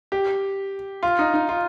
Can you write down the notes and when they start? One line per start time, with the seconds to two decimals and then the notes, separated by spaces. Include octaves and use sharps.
0.12 G4
1.03 F4
1.19 D#4
1.34 D#4
1.49 F4